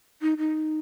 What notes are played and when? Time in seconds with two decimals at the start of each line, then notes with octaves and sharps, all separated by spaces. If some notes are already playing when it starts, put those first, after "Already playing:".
0.22 D#4
0.38 D#4